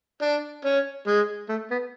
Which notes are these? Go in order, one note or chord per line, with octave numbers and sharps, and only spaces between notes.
D4
C#4
G#3
A3
B3